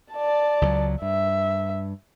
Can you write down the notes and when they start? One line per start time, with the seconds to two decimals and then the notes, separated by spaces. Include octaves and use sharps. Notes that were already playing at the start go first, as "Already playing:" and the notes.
0.13 D5 A5
0.62 C#2 F3 F#3
1.02 G2 E5